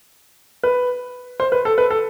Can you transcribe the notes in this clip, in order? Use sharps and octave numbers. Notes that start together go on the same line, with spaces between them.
B4
C5
B4
A4
B4
A4